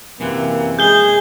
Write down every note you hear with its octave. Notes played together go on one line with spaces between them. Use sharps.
F#2 C3 E3 A#3
G#3 G#4 G6 G7